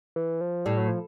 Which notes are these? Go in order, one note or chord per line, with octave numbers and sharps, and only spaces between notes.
E3
F3
A2 G3
F#3
F3